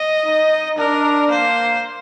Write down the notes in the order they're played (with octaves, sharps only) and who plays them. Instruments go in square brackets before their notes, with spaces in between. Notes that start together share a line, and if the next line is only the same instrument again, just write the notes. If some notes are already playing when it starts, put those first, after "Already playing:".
Already playing: [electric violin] D#5
[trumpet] D#4
[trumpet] D4 [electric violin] A#4
[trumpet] A#3 [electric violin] C5